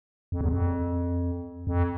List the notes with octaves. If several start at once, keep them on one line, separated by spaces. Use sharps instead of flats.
F2
E2
F2
F2